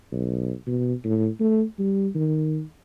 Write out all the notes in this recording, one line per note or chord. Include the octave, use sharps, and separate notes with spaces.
B1
B2
A2
A3
G3
D#3